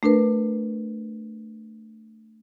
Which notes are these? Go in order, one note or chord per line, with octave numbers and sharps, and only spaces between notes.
A3 D4 A#4 B4